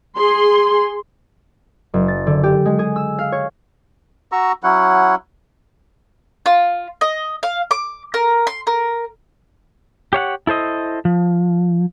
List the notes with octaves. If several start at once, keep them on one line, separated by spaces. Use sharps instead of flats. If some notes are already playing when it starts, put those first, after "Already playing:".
G#4 C6
F#1
A6
D3
G4
G#3
G#4
E6
F5
C#5
F#4 A#5 C#6 E6
F#3 C#4 E4 F#5
F4
D#5
F5
D6
A#4
C6
A#4
G4 C#5 F5 F#5
E4 A4 C5 D#5
F3